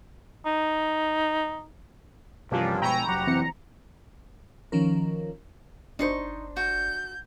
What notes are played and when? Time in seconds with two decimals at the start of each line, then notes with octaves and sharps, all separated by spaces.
0.46 D#4
2.51 G2 C3 E3 F3 A#3 C#4 D4
2.82 B2 G#3 G5 G#5 A#5 B5 C#6 E6
3.08 F1 F#3 G4 F#5
3.27 E3 C4 C#7
4.72 D#3 F3 C#4 A#4
5.99 G1 D4 D#4 C5 C6 C#6
6.57 F#4 G6